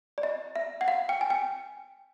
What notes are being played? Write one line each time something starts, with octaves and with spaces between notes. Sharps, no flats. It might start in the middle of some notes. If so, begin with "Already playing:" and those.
D5
D#5
E5
F#5
F5
G5
G#5
G5